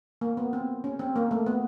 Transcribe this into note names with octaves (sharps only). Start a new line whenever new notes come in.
A#3
B3
C4
C#4
C4
A#3
A3
B3